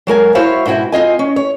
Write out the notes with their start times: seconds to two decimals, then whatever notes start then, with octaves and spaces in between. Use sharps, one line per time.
0.07 F#3 G#3 A#4 G#5
0.35 E4 F#4 C5 C#5 E5 F5
0.66 G#2 B2 E4 F#4 G5
0.92 C4 F4 D#5 G#5
1.19 C#4
1.36 C#5